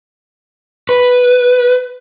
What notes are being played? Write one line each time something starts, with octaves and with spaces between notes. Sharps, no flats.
B4